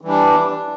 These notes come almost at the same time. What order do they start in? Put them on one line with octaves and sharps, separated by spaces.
E3 G3 D4